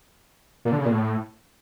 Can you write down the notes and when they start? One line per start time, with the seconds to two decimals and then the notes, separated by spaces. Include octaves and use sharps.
0.65 A#2
0.72 D3
0.79 C#3
0.85 A#2
0.92 A2